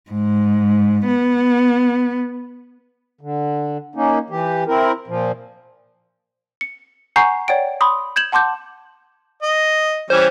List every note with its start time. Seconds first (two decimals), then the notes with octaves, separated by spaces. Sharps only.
0.11 G#2
1.07 B3
3.21 D3
3.95 A#3 C#4 D#4
4.30 E3 G4
4.67 C4 E4 A#4
5.08 A#2 F3
6.61 C#7
7.16 F#5 G#5 A#5 C#6 G6 C7
7.48 C#5 D5 F#5 G5 D7
7.81 B5 C6 D#6
8.16 G6 G#6 E7 F#7
8.32 F#5 A5 C6 D6 G6
9.43 D#5
10.10 E3 G3 C#4 C5